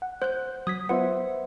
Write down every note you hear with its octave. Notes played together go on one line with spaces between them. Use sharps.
F#5
C5 F#6 G6
F#3 D#6 G#6 B6
B3 F4 B4 C5 E5 F#5